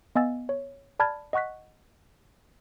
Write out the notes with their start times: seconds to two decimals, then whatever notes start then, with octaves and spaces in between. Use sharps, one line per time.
0.15 B3 D#5 F5 G#5 E6 A6
0.49 C#5
0.99 D5 A5 B5 F6 G#6 A6
1.33 D#5 F#5 C#6 F#6 B6